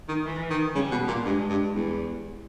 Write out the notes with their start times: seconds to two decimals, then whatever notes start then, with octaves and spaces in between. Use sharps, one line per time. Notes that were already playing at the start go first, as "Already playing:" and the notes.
0.09 D#3
0.25 E3
0.50 D#3
0.75 C#3 G3
0.91 B2
1.08 A#2
1.25 G2 G#3
1.49 G2
1.75 E2 G3